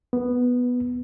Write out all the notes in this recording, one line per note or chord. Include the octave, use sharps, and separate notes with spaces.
B3